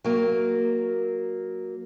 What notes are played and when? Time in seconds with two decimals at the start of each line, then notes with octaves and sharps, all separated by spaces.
0.04 F#3 A#3